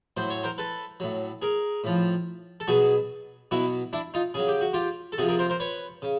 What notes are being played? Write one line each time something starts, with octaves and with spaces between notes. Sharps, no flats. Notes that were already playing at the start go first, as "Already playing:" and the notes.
A2 F#3 C5
C#5
A#4 C5
A4 B4
A2 F#3
G#4 A#4
A2 F3
A4
B2 F#3 F#4 G#4
B2 F#3 E4 F#4
D4 E4
D#4 F4
C#3 F#3 G#4
G4
F#4
F4 G4
A4
C3 F3 F#4 G#4
G#4 A#4
A#4 C5
A#4 C5
B4 C#5
C#3